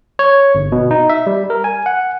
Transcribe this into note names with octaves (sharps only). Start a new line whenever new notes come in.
C#5
G1
B2
D#4
E5
G3
A#4
G#5
F#5